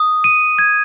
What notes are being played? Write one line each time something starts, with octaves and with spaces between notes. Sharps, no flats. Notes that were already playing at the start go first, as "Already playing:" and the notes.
Already playing: D#6
D#7
G#6